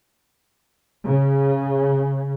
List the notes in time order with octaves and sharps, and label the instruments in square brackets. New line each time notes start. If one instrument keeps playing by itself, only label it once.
[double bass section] C#3